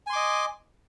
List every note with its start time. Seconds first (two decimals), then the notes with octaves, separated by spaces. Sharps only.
0.07 G#5
0.10 C6
0.13 D6
0.16 D#5